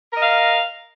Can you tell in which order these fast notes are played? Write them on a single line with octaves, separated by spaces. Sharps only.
A#4 D#5 F5